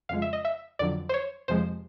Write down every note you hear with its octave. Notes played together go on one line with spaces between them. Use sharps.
F2 C#3 F3 G#3 F5
E5
D#5
E5
F2 D3 F#3 D5
C5
C#5
F2 C3 F3 G#3 C5